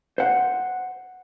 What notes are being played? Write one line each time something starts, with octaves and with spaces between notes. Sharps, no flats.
C5 F#5